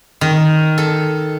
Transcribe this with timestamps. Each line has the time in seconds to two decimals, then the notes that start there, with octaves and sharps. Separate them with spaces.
0.21 D#3
0.78 A4